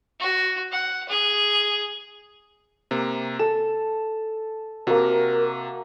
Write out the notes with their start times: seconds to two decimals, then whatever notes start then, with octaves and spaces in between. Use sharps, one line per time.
0.20 F#4
0.72 F#5
1.09 G#4
2.91 C3 A#3
3.39 A4 E7
4.87 C3 A#3 F#4 A#4